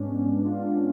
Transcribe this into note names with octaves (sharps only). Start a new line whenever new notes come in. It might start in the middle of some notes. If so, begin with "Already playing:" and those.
Already playing: G#2 G#3 B3 C#4 D4
G#2 G#3 B3 D4
F4
D4
C#4